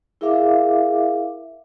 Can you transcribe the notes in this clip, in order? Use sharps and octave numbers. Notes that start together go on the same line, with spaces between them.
E4 G#4 A#4 E5 F5 D6